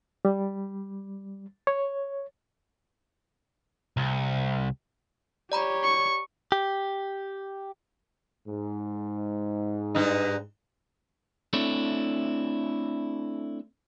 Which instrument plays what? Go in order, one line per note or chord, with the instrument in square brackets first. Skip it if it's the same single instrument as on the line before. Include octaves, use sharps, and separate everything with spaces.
[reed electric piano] G3
C#5
[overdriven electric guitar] C2
[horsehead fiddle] G4 C#5 [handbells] D5 A#5 B5
[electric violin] C#6
[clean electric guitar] G4
[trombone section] G#2
[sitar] G2 D#4
[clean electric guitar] A3 C4 D4 E4 A4 C#5